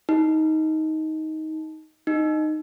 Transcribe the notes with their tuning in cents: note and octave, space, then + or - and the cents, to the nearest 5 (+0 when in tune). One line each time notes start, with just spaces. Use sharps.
D#4 +15
D#4 -10